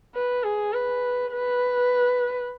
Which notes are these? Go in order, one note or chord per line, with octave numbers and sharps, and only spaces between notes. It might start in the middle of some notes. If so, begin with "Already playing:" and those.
B4
G#4
B4
B4